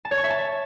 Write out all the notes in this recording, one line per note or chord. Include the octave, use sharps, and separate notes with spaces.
A5
C#5
C#6
E5
A5